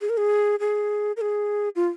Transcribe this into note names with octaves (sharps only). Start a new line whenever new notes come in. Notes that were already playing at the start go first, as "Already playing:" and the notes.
G#4
A#4
G#4
G#4
A#4
G#4
F4